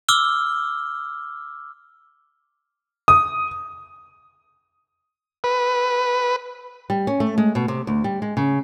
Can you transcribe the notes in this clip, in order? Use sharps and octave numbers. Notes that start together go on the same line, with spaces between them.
D6 E6 F6 G7
D#6
B4
G3
C#4
A3
G#3
B2
C3
D2
G3
G#3
C#3